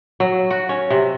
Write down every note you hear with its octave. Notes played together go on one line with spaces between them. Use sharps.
F#3
F#4
C#4
C3